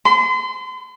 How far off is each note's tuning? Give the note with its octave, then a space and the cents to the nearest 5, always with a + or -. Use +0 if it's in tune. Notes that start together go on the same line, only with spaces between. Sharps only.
C6 -35